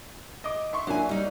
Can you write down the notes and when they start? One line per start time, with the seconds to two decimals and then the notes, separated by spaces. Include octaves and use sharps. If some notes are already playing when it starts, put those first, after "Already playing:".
0.44 D#5 D6
0.73 E5 C6 C#6
0.87 F#3 A#3 D4 E4 G#5
1.09 G3 D#4